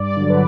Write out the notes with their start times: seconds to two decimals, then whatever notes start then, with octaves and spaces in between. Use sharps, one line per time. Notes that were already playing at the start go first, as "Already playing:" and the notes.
Already playing: G2 D5
0.16 D3 F#3
0.30 B4